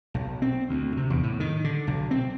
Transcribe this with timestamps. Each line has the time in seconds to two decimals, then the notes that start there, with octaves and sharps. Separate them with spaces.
0.14 B1
0.42 C4
0.69 D2
0.97 C3
1.10 E2
1.23 A2
1.40 D#3
1.64 D3
1.87 B1
2.11 C4